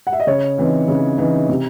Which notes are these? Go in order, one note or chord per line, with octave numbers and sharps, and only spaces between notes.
F#5
E5
D#5
C#3 C#5
E3 C4 D#4
C#3
E3 C4 D#4
C3